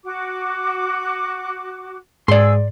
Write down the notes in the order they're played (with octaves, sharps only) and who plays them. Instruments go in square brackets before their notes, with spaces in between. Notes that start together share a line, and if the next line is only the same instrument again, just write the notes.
[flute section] F#4 D6
[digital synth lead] G#2 [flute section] G#4 E6 [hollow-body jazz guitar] D5 C6